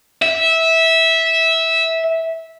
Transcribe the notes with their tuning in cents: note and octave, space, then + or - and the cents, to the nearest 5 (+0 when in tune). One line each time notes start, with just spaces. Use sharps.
E5 -15